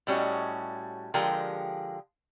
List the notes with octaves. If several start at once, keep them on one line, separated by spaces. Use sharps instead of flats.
A2 G3 C#4 F#4 D#5
D3 F3 G#3 G4 A#4 G5